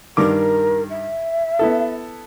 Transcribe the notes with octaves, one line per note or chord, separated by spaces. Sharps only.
G2 D#3 A#4 D6
E5
B3 E4 A4